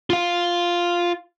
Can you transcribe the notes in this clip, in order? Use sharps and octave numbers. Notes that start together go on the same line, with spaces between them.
F4 F5